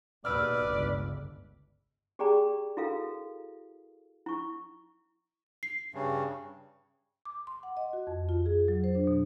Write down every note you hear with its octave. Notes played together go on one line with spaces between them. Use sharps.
D#2 G#2 B2 B4 D5 E6 F6
G1 C#2
G4 G#4 D5 G5 A#5
E4 F#4 A4 A#4 F5
E4 C#6
C7
G2 C#3
D6
C6
F#5
D#5
F#4
F2
F4
G#4
F#3
C5
D4
B2